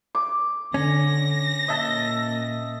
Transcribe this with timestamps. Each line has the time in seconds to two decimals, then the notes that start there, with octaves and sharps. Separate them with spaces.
0.15 D6
0.74 D3 C#4 A#6
1.68 A#2 D#5 E5 A5